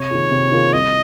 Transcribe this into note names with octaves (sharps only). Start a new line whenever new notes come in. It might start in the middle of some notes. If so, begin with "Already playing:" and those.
Already playing: C3 C#5
D#3 A#3 F4 G#4
C3
D#3 A#3 F4 G#4
C2 D#5